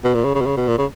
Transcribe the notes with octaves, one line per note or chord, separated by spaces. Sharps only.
B2
A#2
C#3
C#3
B2
C#3
B2
A#2
C#3